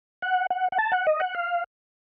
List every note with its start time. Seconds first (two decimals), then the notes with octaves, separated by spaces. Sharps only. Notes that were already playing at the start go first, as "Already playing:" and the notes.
0.22 F#5
0.50 F#5
0.72 F#5
0.78 A5
0.92 F#5
1.07 D#5
1.20 F#5
1.35 F5